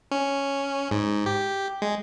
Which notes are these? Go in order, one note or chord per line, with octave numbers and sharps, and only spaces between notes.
C#4
G#2
G4
G#3